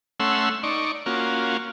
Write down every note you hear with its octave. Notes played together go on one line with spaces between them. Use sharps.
A3 C#4 F#5 C6 E6
D#4 D5 C#6
A#3 C#4 F4 F#4